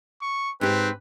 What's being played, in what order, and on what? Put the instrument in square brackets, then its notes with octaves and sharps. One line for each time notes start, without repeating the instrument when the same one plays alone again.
[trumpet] C#6
[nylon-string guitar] G#2 G4 [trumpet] C4 [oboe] B4